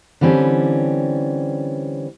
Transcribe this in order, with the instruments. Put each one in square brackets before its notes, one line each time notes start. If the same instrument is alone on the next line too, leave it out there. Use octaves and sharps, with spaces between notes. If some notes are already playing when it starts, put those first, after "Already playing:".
[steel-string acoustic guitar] D3 E3 G3 C4 C#4